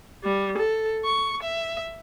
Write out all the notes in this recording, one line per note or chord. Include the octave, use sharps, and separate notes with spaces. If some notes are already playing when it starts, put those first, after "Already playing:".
G3
A4
C#6
E5